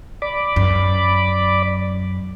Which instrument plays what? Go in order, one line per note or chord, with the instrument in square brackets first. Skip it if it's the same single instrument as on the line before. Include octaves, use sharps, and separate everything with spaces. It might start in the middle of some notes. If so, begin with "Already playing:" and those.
[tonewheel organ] D5 B5 D6
[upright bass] F#2